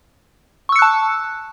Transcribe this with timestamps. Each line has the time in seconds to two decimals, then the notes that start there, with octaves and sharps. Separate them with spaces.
0.69 C#6
0.72 E6
0.76 C#7
0.79 F#6
0.82 A5